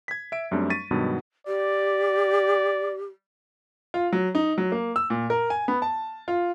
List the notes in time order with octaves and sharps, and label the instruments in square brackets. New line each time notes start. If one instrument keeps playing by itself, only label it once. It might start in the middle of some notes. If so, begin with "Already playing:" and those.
[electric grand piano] G#6 B6
E5 D7
F#2 G3 A3 C4 D4
C#6 A6 B6 D#7
G2 B2 D#3 F#3 G#3 B3
[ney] G4 [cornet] D5
[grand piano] F4
F#3
D#4
F#3
A#3
E6
A#2
A#4
G#5
B3
A5
F4